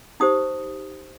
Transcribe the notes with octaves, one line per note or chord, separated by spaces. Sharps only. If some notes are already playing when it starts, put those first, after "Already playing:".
D#4 G4 C5 D#6